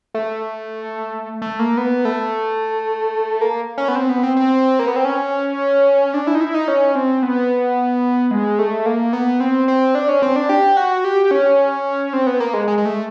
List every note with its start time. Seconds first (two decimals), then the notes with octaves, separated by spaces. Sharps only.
0.14 A3
1.42 A3
1.59 A#3
1.77 B3
2.05 A3
3.41 A#3
3.78 C#4
3.88 B3
3.95 C4
4.09 B3
4.23 C4
4.37 C4
4.79 A#3
4.88 B3
4.96 C4
5.05 C#4
6.14 D4
6.27 E4
6.35 D#4
6.41 E4
6.54 D#4
6.68 C#4
6.95 C4
7.23 B3
8.31 G#3
8.59 A3
8.86 A#3
9.13 B3
9.40 C4
9.68 C4
9.95 D4
10.09 C#4
10.22 C4
10.36 D4
10.49 G4
10.77 F#4
11.04 G4
11.31 C#4
12.13 C4
12.27 B3
12.40 A#3
12.54 G#3
12.68 G#3
12.78 G#3
12.85 A3